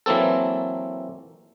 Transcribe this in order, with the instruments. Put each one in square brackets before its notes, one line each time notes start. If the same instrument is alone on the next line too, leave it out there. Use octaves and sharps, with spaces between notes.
[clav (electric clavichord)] E3 F#3 A#3 C4 A4